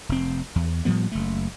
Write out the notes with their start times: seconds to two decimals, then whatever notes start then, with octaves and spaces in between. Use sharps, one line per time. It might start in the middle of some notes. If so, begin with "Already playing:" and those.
0.09 F1 C4
0.56 E2
0.85 A2 F3 G3 B3
1.12 F#1 A3